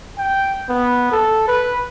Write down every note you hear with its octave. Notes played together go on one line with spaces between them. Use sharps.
G5
B3
A4
B4